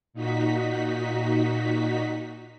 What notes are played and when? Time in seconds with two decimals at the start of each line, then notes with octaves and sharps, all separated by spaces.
0.14 A#2 D#4 F#4 B6